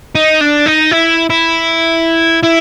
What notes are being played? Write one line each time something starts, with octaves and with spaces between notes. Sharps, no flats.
D#4
D4
D#4
E4
E4
E4